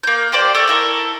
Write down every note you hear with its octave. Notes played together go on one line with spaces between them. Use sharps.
A#3 G6
A#3 G4 C5 D5
A4 D5 E5 C#6
E4 A4 A#4